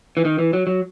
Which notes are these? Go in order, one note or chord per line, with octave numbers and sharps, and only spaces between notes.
E3
D#3
E3
F#3
F#3